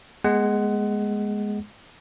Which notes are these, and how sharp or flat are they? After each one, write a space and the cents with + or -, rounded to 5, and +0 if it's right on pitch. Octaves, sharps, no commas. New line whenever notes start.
G#3 +0 B3 -35 F#5 +15